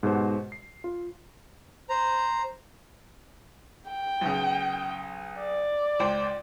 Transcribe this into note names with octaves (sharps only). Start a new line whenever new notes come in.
G#2 B2 F#4 G4 C5
C7
F4
C5 A#5
G5
B1 C#3
D5
C#2 C5 G5